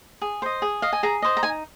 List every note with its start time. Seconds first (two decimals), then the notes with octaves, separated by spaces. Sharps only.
0.21 G#4
0.42 C5 D#5
0.62 G#4
0.82 D#5 F5
0.93 G#5
1.03 G#4 A#5
1.22 C5 D#5
1.37 A#5
1.43 D#4 G#5